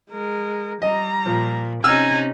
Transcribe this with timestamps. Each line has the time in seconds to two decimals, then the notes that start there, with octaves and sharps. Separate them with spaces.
0.10 G#3 A#4
0.82 G3 D#5 A#5
1.26 A#2 F3
1.84 C3 C#4 D#4 G#5 A#5 E6 F6